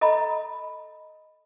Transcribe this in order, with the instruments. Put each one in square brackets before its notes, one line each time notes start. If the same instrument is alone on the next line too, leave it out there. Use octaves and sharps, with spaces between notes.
[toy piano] A4 D#5 A#5 B5